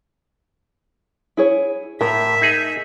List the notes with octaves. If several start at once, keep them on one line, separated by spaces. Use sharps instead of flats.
E4 G#4 C#5
A2 A#4 E5
D#4 G#4